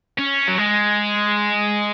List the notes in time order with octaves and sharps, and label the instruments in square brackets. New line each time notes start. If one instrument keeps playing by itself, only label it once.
[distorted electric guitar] C#4
F#3
G#3